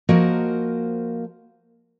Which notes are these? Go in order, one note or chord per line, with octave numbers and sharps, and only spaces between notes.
F3 A#3 F#4 A#4 C5 D#5